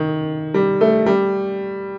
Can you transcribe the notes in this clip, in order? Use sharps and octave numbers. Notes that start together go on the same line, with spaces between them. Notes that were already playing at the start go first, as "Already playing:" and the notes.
Already playing: D#3
G3
A3
G3